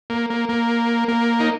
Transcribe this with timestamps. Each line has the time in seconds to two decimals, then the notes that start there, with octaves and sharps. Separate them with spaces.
0.10 A#3
0.30 A#3
0.49 A#3
1.08 A#3
1.40 D#4